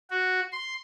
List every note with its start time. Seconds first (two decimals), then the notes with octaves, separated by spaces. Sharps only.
0.10 F#4
0.52 C6